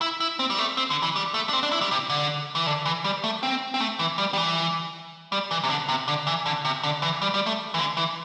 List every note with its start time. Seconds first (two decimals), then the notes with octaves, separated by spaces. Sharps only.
0.01 E4
0.20 E4
0.39 C4
0.50 G3
0.59 A3
0.77 C4
0.90 D3
1.03 E3
1.16 G3
1.34 A3
1.49 D4
1.53 C4
1.63 D4
1.72 E4
1.81 G3
1.91 C3
2.10 D3
2.55 E3
2.67 D3
2.86 E3
3.04 G3
3.24 A3
3.43 C4
3.74 C4
3.80 A3
3.99 E3
4.18 G3
4.33 G3
4.37 E3
5.32 G3
5.51 E3
5.63 C3
5.70 D3
5.89 C3
6.08 D3
6.27 E3
6.46 D3
6.65 C3
6.83 D3
7.02 E3
7.22 G3
7.34 G3
7.46 A3
7.74 E3
7.78 D3
7.97 E3